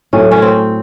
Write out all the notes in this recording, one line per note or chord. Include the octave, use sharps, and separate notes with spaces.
A2 F#3 A3 C#4
C#4
C4